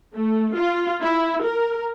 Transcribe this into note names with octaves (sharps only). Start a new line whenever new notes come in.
A3
F4
E4
A#4